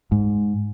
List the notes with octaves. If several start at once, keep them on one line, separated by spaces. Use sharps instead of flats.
G#2